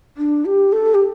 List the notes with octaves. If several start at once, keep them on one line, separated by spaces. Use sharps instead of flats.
D4
G4
A4
G4